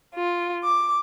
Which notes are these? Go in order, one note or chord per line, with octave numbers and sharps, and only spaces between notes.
F4
D6